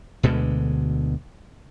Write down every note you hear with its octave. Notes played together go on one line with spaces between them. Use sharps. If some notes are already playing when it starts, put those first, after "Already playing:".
D2 B2 D3 G#3